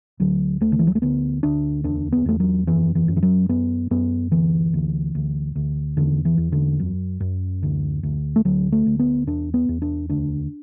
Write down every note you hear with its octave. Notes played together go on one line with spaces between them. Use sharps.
D2 F#3
D2 A3
D3
E3
F#3
A3
D2 B3
D2 D4
E2 D4
B3
E2 A3
F#3
F#2 E3
E3
F#2
E3
F#3
F#2 B3
F#2 B3
D2 E3
D2
D2
D2
E2 D3
E3
E2
D3
F#2
F#2
D2
D2
A3
D2 F#3
A3
D2
B3
E2 D4
B3
E2
D4
D2 D4